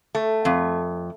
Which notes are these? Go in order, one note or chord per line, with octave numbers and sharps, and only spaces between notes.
A3
F2